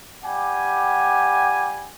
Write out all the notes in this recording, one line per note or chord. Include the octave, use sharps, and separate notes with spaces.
G3 G4 F#5 G#5